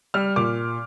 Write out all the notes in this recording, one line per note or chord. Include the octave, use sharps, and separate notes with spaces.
G3 F6
A#2 D6